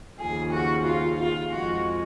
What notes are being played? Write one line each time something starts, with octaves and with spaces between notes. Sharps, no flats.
D#2 C#3 F3 G#4
F#4
F4
F4
F2 F3 G#3 F#4